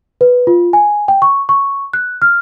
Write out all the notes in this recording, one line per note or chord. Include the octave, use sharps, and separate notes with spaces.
B4
F4
G#5
G5
C#6
C#6
F#6
F6